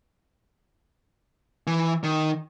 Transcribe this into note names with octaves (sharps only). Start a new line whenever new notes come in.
E3
D#3